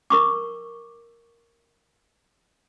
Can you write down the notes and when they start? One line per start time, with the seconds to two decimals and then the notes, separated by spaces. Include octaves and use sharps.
0.10 A#4 C#6 D6